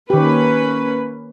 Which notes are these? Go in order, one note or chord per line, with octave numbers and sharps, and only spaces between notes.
D#3 A#3 C#4 G4 B4